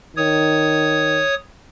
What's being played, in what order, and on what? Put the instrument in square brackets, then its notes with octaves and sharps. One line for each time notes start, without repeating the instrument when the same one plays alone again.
[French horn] D#3 [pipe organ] C#5 D#6